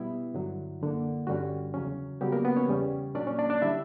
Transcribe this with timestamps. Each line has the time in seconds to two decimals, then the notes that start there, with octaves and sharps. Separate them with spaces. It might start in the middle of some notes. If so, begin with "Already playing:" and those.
Already playing: B2 G3 B3 E4
0.34 G2 D3 F#3
0.81 F#2 D3 A#3
1.27 G2 D3 G3 C#4 F#4
1.74 E2 C#3 F#3 C#4
2.21 C#3 F#3 G3 B3 G4
2.32 A#3 A#4
2.45 B3 B4
2.56 C#4 C#5
2.68 E2 C#3 G3 C#4
3.15 A#2 F#3 A#3 C#4 D4 D5
3.27 C#4 C#5
3.39 D4 D5
3.50 D4 D5
3.62 D3 G3 E4 E5